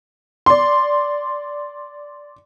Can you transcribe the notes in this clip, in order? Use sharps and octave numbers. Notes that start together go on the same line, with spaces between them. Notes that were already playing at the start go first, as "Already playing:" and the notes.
D5 C6